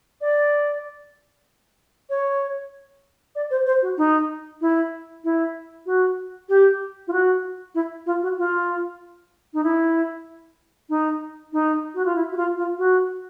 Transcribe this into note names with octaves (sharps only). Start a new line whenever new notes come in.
D5
C#5
D5
C5
C5
F#4
D#4
E4
E4
F#4
G4
F4
F#4
E4
F4
F#4
F4
D#4
E4
D#4
D#4
F#4
F4
E4
F#4
F4
F4
F#4